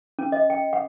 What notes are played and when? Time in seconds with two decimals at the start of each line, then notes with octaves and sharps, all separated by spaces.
0.19 C#4
0.32 D#5
0.50 G5
0.73 F#5